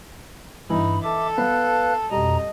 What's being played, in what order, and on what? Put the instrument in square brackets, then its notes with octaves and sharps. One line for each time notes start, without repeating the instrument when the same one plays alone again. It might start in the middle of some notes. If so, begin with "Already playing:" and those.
[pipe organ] G2 B5 [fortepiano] E3 [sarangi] D#4
[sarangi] A4 [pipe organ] E5 D6
[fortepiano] B3 [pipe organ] B4 F5 F#6
[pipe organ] F2 B2 A#5 [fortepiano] G3 [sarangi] D#5